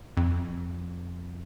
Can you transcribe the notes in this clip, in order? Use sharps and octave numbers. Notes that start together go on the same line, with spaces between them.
F2